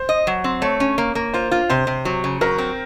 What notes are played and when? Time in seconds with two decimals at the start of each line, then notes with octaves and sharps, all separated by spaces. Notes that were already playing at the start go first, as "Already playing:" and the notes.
Already playing: C5
0.09 D#5
0.27 F#3
0.44 C4
0.62 A3 C#5
0.80 C#4
0.98 A#3
1.15 A#3
1.34 F4 C5
1.51 F4
1.70 C3 C5
1.87 C3
2.05 F#3
2.24 C#3
2.41 F#3 A#4
2.58 C4